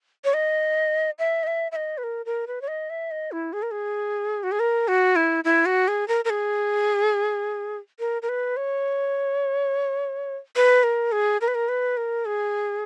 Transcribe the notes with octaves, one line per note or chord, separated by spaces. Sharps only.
C#5
D#5
E5
D#5
E5
E5
D#5
B4
A#4
A#4
B4
C#5
D#5
E5
D#5
E4
G#4
A#4
G#4
F#4
G#4
A#4
F#4
E4
E4
F#4
G#4
A#4
A#4
G#4
A#4
A#4
B4
C#5
B4
A#4
G#4
A#4
B4
A#4
B4
A#4
G#4